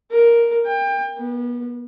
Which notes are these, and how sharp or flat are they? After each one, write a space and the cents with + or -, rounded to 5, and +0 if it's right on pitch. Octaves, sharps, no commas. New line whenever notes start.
A#4 +5
G5 +30
B3 -30